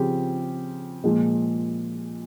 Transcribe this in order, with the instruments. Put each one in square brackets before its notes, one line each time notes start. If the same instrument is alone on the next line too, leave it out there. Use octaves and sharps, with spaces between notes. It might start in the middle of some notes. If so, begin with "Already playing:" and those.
Already playing: [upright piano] C#3 F3 C4 G4
A#2 F3 G#3